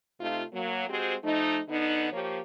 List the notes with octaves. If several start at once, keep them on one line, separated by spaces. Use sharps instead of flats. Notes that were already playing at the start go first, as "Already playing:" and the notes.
C3 A3 D#4 F4
F#3 A#3
G#3 C4 F#4 G4 C5
F3 A3 D#4
D3 B3 D#4
F3 A#3 G4 C#5